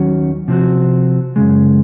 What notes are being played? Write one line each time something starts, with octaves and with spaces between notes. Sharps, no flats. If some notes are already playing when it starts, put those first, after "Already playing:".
Already playing: D#2 D#3 F#3 C#4 F#4
C3 F3 C4 F#4
F#2 C#3 G#3